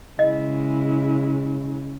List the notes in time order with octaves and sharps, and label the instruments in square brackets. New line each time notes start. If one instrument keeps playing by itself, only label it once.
[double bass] C#3 [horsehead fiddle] G#3 E4 [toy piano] D#5